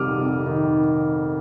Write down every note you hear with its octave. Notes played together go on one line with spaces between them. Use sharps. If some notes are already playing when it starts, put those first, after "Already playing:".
Already playing: F2 C3 D#3 G3 D6 D#6 F6
F2
D#3